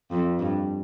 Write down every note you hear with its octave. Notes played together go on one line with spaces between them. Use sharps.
F2
G2